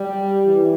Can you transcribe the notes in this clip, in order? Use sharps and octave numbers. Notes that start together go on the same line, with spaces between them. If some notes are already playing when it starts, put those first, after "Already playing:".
Already playing: G3
E3